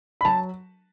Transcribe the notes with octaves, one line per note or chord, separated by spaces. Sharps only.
B5
F#3 A5